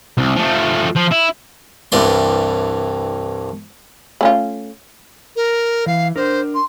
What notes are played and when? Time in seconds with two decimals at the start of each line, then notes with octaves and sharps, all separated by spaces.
0.17 C2
0.36 F3 A3
0.95 F3
1.11 E4
1.92 C2 G2 E3 D5 C6
4.21 A3 C#4 F4
5.36 A#4
5.86 E3 F5
6.16 D4 A#4 C5
6.54 C6